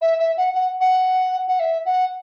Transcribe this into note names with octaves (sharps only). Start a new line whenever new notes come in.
E5
E5
F#5
F#5
F#5
F#5
E5
F#5